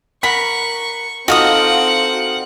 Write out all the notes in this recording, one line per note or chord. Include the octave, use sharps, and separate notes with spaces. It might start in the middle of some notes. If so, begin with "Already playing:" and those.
A#4 F#5 B5 C#6 B6
C4 D#4 F4 F#4 A4 F5 F#5 D#6